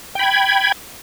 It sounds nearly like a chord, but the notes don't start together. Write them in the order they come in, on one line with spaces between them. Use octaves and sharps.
G5 B5 G#6